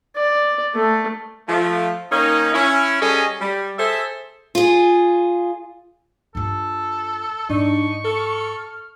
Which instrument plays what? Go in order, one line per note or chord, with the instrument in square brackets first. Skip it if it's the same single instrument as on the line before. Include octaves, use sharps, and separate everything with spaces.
[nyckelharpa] D5
A3
[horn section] F3 A3
D#3 A#3 C#4 D#4
C#4 E4
G3 C#4 G#4 A4 C#5 D#5
G3
G#4 A4 C5 E5
[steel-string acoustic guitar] F4 G#4
[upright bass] G2 F4 [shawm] A4
[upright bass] G#2 [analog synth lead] D4 [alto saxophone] D#4 [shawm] C#6
[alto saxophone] A4 [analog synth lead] F6